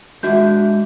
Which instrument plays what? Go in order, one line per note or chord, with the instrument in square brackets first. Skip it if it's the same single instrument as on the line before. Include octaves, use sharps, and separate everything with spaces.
[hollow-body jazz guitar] G#3 D4 E5 [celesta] F#4 G6